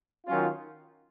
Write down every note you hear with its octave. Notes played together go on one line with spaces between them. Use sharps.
D#3 F#3 C#4 F4